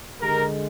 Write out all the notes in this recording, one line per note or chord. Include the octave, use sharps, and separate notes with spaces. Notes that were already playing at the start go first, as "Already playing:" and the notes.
D3 G#3 G4 A#4